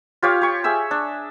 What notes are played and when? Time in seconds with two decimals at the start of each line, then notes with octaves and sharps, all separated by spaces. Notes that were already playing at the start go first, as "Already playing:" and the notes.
0.22 F4 G4 C#5 F5
0.42 G4 C#6
0.64 G#4 E5 E6
0.91 D4